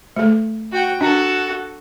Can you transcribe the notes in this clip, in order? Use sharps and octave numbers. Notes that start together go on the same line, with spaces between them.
A3 A4
F#4 G5
D4 F#4 A4